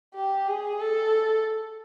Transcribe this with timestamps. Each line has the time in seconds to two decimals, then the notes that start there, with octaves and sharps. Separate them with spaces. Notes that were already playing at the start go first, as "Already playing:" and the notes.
0.15 G4
0.47 G#4
0.80 A4